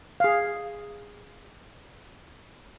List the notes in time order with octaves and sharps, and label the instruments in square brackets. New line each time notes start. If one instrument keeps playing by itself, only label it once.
[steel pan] G#4 F5